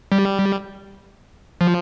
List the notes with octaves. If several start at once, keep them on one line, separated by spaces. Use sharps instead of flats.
G3
F3